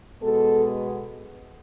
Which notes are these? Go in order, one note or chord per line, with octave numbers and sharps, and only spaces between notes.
B2 G#3 B3 A4